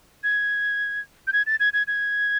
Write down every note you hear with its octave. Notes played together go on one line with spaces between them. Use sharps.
G#6
G6
G#6
A6
G#6
G#6
G#6